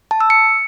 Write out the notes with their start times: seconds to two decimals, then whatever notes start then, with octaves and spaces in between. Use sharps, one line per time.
0.11 A5
0.21 E6
0.30 C#7